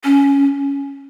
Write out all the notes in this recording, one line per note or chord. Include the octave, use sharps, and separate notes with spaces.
C#4